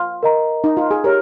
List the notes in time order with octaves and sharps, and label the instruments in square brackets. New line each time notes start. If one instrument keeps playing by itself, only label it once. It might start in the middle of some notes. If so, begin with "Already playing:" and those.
Already playing: [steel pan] F4
[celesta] A#4 D#5 A#5
[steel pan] D#4
F4
G#4
[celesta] G4 C#5 [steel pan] A#4